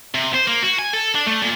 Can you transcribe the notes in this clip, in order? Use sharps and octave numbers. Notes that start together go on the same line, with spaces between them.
C3
C5
A#3
F#4
G#5
A4
D4
A3
A#2